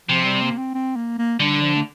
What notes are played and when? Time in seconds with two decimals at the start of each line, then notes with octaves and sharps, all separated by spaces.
0.09 C3 F3
0.25 G3
0.42 A#3
0.58 C4
0.74 C4
0.96 A#3
1.19 A#3
1.40 D3 G3
1.62 F3
1.76 A3